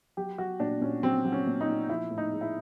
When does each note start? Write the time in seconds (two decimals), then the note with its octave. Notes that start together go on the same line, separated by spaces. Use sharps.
0.17 F#3 G4
0.38 F#3 F#4
0.60 A#2 D4
0.81 A#2 C#4
1.03 F#3 C4
1.25 F#3
1.32 C#4
1.47 A#2
1.61 D#4
1.68 A#2
1.89 F3 E4
2.11 A2
2.18 D#4
2.32 G#3
2.41 E4